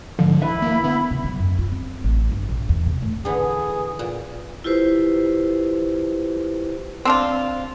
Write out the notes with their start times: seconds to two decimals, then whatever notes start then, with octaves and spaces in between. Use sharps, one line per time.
0.19 G#2 D3 F3
0.42 D#2 E4 B4 E5 B5
0.62 A#3
0.84 D3 B3
1.11 C#3
1.24 F#3
1.39 F#2
1.59 F4
1.72 C4
2.04 A1
2.31 G1
2.49 A#1
2.69 E2
2.86 C3
3.02 A2
3.25 D3 E3 G#4
3.99 A#2
4.64 E4 F4 G4 B4 C5
7.05 C4 D4 F4